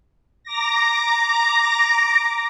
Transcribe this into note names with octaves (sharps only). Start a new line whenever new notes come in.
A#5 D6 A#6